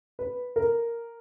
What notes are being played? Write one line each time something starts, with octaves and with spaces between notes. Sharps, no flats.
B4
A#4